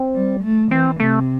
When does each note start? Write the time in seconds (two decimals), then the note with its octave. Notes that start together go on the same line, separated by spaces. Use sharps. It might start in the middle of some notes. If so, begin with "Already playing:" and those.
Already playing: C4
0.15 G3
0.43 A3
0.71 E3 C4
1.00 C3 A3